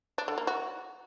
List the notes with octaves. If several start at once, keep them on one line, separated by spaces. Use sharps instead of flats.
D4
D3
A#3
F#4